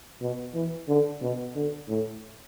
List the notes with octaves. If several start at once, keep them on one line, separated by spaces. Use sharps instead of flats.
B2
E3
D3
B2
D3
A2